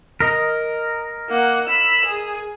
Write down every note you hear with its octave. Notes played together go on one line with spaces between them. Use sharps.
A#4 D#5
A#3 F#5
B5 E6
G#4